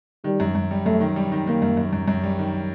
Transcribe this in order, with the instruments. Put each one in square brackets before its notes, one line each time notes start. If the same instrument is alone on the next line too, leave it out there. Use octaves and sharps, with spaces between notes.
[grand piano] D#3 [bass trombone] G3
[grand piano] F#2
F#2
G3
[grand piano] F#2 [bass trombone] A3
[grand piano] D#3
G3
D#3
[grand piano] D#3 [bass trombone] A#3
[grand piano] F#2
F#2
F#2
F#2
G3
D#3